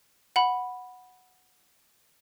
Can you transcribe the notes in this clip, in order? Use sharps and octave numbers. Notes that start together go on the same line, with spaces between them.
F#5 B5